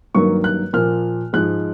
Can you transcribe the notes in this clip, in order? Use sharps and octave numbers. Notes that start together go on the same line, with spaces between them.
G2 D#3 F#3 A#3 C#6
F#6
A#2 F3 A#3 F6
G#2 F3 G#3 F#6